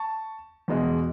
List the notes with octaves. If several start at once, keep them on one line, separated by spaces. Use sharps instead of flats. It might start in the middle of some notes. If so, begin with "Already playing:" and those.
Already playing: A5 C#6
E2 B2 G#3